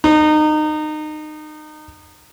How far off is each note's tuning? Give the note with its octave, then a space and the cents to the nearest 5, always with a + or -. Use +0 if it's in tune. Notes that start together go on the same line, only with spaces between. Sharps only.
D#4 -25